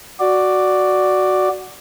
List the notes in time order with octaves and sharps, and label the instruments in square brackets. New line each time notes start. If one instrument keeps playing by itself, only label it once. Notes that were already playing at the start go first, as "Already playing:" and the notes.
[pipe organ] F#4 D5